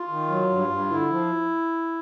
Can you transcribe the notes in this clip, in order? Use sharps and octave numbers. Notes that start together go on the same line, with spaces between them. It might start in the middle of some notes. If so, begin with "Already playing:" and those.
Already playing: F4
D#3
F#3
G2
G2
D3 E4
F3